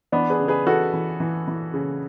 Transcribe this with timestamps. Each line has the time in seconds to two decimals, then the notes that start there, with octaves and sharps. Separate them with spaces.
0.12 E3 B3 D4
0.30 G#4 B4
0.39 C#3
0.48 G#4 B4
0.66 E3 F#4 A4
0.93 E3
1.20 E3
1.48 E3
1.74 C#3